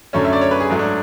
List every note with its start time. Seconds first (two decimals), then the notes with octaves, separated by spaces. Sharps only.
0.13 F#2 D3 A3 C#4
0.25 E5
0.33 D5
0.41 C#5
0.51 B4
0.60 G#4
0.70 G#2 F#3 A3
0.79 D4